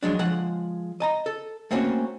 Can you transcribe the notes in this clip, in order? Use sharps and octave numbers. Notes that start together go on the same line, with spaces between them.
F3 F#3 G#3 D4
F3 G#3 F#5
D#5 A5 A#5
A4
A3 A#3 C4 C#4 F#4